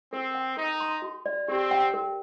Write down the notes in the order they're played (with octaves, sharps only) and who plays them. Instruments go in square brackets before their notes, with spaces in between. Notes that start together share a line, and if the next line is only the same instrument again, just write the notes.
[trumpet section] C4 [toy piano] A#4
[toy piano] G5
[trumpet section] D#4 [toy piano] A#4
[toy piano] C6
F#4
D5
[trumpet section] C4 [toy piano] G4
[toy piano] G5
A#4